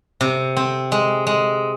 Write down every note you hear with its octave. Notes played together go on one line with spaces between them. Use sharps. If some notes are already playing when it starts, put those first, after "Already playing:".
C3
C4
G#3
G#3